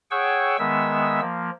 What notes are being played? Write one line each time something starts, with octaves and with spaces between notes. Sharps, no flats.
G#4 C#5 F#5 G5 C#6 E6
D#3 G#3 B3 E5 E6
F3 A#3